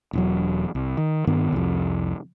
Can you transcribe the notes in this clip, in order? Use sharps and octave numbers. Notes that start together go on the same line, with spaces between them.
E1 E2 F#3
C2
D#3
G2 D#3 B3
C2 F2